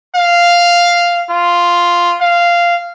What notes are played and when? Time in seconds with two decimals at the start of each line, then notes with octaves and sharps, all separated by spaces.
0.15 F5
1.30 F4
2.21 F5